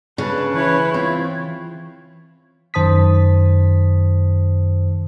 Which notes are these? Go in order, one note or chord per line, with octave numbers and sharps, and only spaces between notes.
C#3 B4 A5
E3 E4 B4 C#5 C#6 G#6
C4 F4
F#2 D#3 C5 A5 D#6 B6